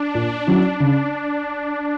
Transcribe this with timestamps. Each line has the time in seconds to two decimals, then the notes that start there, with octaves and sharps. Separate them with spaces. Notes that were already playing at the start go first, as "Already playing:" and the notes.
Already playing: D4
0.15 A#2
0.47 F#3 C#4 E4
0.80 C#3